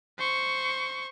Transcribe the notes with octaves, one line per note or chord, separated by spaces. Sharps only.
C5 C#6